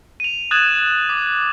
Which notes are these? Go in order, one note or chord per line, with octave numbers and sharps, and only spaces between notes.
D#7 F7
D#6 F#6 G#6 A6 E7 F#7
D6